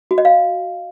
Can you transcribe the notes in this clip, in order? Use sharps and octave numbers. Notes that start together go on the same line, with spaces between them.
F#4
D#5
F5